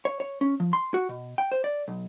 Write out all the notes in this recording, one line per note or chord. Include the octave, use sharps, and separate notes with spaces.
C#5
C#5
C#4
F3
C6
F#4
B2
G5
C5
D5
B1